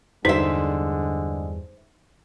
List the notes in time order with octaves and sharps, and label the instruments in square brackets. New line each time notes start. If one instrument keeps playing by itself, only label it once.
[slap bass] E2 G2 [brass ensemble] D3 G#3 [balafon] D#4 [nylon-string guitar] C5 E5